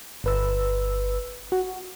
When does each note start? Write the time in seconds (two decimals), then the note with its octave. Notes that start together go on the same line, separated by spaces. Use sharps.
0.24 G1 B4 E6
1.52 F#4